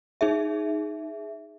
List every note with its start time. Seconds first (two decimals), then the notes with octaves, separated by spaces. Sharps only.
0.21 D#4 G#4 E5